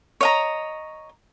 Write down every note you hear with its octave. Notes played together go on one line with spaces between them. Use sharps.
C#5 D#5 A#5